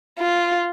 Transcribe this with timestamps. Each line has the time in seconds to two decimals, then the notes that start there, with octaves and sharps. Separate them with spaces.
0.19 F4